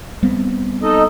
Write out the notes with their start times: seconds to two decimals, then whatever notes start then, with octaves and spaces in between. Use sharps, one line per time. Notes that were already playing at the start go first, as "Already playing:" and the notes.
0.23 G3 B3 C4
0.83 D#4 A4 D#5